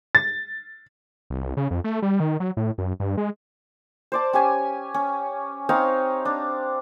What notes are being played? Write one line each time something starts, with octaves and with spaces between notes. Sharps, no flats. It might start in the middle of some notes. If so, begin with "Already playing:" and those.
A6
C2
C#3
F2
A3
G3
D#3
F#3
A2
F#2
G2
G#3
C5 D5 A5
C#4 G4 G#5
C#4
C4 D#4 C#5 F5
D4